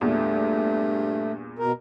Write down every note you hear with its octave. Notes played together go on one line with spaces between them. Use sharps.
E2 G2 A#2 A3
B2 A#4